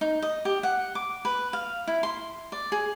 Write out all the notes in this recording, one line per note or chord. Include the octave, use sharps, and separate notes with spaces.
D#4
D#5
G4
F#5
D6
B4
F5
E4
C6
D5
G#4